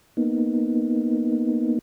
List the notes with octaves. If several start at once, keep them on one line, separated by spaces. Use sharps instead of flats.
A#3 B3 D#4